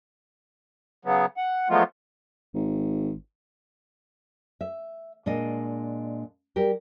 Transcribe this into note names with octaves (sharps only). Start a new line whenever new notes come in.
C#3 F#3 B3
F#5
F3 F#3 G#3 A3 B3 F4
G#1
E5
A#2 G#3 D4 D#5
G3 G4 A#4